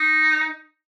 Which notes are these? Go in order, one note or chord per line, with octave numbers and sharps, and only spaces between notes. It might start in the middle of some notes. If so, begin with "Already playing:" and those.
Already playing: D#4